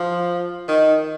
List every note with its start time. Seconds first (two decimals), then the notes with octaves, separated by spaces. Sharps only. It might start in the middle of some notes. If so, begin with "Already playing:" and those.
Already playing: F3
0.68 D#3